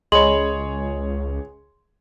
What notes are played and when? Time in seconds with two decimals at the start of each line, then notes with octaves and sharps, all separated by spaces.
0.12 C#2 G#4 C#5 D#5 B5 C6 F#7